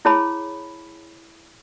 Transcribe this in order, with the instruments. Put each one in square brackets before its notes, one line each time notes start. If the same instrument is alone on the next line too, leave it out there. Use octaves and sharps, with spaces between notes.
[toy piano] E4 G#4 C#5 A5 B5